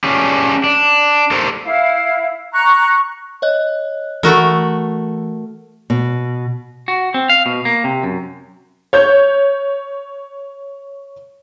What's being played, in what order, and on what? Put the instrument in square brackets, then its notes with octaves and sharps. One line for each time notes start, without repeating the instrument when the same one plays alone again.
[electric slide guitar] C#4 D4 G4 G#4
D4
G4 A4 A#4 C5
[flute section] E4 F5
A#5 C#6 F#6
[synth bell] C#5 D#5 F#6
[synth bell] E3 [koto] A3 F#4 A#4
[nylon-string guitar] B2
[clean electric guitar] F#4
C4
F5
B2
A#3
C3
F#2
[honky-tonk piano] C#5 G6